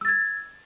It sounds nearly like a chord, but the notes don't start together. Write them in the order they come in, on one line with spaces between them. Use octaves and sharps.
E6 A6 G#6